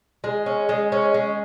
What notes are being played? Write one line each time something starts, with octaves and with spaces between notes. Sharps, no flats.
G#3
C#4
G#3
C#4
G#3